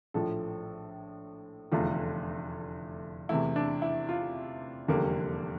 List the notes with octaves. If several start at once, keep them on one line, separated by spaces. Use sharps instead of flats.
A#1 A2 F3 A4
F1 E2 D3 A3 F4
E2 C3 E3 A3 E4
D4
E4
F4
F1 E2 D3 G3 A#3